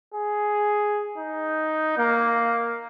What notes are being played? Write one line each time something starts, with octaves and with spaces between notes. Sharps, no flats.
G#4
D#4
A#3